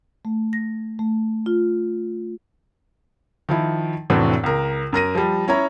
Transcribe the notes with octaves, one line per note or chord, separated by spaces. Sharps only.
A3
A#6
A3
F4
D#3 F3 E4
F1 A2 E3 C4 D4 F#4
C#2 A#4
F#2 A#4 A#6 D#7
F3 G3
C#4 E4 C#5 A#5